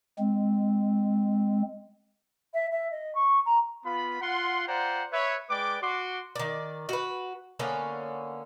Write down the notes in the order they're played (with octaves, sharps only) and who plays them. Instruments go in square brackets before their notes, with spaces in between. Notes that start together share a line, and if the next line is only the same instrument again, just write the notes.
[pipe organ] G#3 C4
[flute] E5
E5
D#5
C#6
A#5
[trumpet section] B3 F4 B5
F4 F#5 C6
F4 C5 D5 F#5 G5 A#5
B4 C#5 E5
G#3 B4 D5 G5 D6
F#4 C6 D6
[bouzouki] D#3 D5
F#4 B4
D3 A#3 B3 C#4